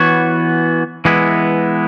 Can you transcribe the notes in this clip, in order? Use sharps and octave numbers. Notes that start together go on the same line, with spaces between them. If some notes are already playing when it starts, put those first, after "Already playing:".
Already playing: E3 B3 F#4 C#5
E3 G#3 B3 E4